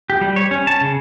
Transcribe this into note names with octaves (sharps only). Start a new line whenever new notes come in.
G4
G3
C#5
C#4
A5
C#3